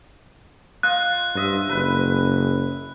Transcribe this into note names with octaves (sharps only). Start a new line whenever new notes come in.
F4 D#5 F#6
G2 C5 D#5 E5
F#1 B4 B5